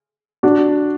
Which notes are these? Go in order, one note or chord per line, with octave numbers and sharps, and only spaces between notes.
D4 F#4